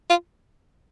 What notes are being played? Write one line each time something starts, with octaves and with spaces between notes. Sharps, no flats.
F4